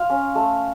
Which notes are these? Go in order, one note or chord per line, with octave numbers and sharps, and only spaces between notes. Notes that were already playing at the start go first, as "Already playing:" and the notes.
Already playing: F4 F5
C#4
A3